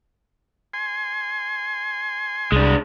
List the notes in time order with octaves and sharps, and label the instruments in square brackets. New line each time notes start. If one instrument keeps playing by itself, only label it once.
[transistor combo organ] G#5 C6
[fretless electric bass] C2 [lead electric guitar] G#3 D4